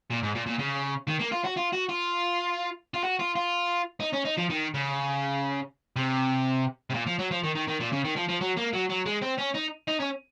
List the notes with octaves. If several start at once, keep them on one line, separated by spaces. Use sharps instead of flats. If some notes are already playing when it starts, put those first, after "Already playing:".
A#2
G#2
A#2
A#2
C#3
D#3
A#3
F4
F#4
F4
F#4
F4
F4
F#4
F4
F4
D#4
C#4
D#4
F3
D#3
C#3
C3
C3
A#2
F3
F#3
F3
D#3
D#3
D#3
A#2
C#3
D#3
F3
F3
F#3
A#3
F#3
F#3
G#3
C4
C#4
D#4
D#4
C#4